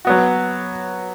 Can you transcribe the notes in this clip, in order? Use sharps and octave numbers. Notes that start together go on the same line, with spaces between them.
F#3 B3 F#4